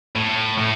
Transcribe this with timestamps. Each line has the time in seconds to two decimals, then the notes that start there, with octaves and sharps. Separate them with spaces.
0.16 A2
0.58 A2